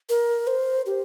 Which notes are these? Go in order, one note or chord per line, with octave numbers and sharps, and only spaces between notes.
A#4
C5
G4